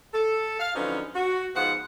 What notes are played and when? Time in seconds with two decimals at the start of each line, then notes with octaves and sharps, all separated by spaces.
0.13 A4
0.60 F5
0.75 D3 F3 F#3 B3 C#4 D#4
1.15 F#4
1.55 G#2 B2 F3 B3 F#5